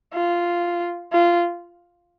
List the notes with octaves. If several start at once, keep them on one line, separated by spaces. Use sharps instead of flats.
F4
F4